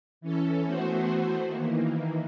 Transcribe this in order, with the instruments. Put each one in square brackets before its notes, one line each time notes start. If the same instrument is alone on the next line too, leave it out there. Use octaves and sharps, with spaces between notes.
[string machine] E3 C#4 A4
E3 A3 B3 F#4 C5
D#3 E3 A#3